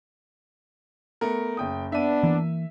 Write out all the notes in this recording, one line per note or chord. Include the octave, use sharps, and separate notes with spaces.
A3 B3 A#4
F#1 G5 D#6
B3 D4 E5 D#7
E3 A#3